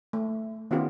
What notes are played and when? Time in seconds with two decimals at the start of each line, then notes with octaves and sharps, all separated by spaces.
0.13 A3
0.71 D#3 B3 C#4 F4 G4